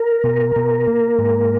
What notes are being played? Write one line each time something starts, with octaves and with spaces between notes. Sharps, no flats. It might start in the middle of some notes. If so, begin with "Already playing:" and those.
Already playing: A#4
B2
B2
A#3
G#2